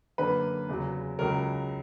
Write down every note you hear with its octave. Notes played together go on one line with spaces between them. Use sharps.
F#2 D3 A#3 B4
E2 C#3 F#3
C#2 C#3 F#3 C#4 A#4